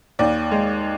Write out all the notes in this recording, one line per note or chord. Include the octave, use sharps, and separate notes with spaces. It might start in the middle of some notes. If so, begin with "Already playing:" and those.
D#2 D5
G#3